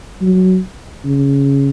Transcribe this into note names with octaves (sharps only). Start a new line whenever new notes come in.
F#3
C#3